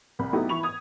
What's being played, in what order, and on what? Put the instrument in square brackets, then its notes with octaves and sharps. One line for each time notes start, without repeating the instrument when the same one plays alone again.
[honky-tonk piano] C2 B5
F#3 A3 B3 D#4 E4 G4
E3 B5 C#6 F7
D#6 G#6